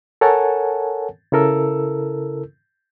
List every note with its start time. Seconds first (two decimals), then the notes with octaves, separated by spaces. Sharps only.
0.21 A4 A#4 C#5 F#5 G#5 A5
1.32 C#3 E4 A4 A#4 E6